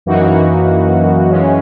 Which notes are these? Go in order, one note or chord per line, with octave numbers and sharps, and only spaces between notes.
F#2 E3 A#3 D#4 F#4
F#2 E3 G#3 C#4